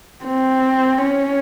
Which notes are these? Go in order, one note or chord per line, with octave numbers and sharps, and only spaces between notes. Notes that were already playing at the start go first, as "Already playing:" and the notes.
C4
C#4